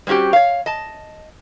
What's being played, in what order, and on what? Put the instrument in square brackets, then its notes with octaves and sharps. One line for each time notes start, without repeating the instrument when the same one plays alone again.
[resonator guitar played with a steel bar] G3 C4 C#4 F#4 G4
C#5 F5
D#5 A5